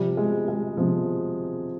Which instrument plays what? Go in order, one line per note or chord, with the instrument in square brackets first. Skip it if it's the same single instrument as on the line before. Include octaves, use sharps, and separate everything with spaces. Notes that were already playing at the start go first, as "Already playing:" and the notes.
Already playing: [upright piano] C3 F3 G3
G#3
G#3
C3 F3